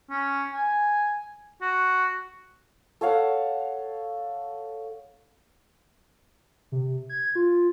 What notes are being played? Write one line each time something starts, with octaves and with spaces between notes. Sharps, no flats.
C#4
G#5
F#4
A4 C#5 F5 F#5
C3
G#6
F4